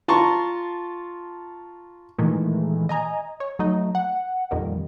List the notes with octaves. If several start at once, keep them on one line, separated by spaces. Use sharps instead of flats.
F4 A5 A#5 C6 C#6
A#2 D#3 E3 G#3 A3
D#5 G#5 A#5
C#5
F#3 A3 D#4
F#5
F2 A#2 D#3 G3